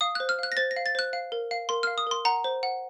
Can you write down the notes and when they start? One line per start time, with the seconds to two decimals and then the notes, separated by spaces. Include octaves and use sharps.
0.01 F5 D#6
0.15 C5 F#6
0.29 F6
0.39 F5 F#6
0.52 A#6
0.57 C5 A6
0.71 A#6
0.76 F5
0.86 A6
0.95 C5 F#6
1.13 F5
1.32 A#4
1.51 F5
1.69 A#4 C6
1.83 F5 F6
1.98 D#6
2.07 A#4 C6
2.25 F#5 A#5
2.44 C5
2.63 F#5